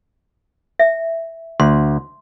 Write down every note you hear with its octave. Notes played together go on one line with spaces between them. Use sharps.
E5
D2 C6